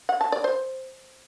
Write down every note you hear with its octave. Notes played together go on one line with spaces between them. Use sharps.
F#5
A5
D5
C5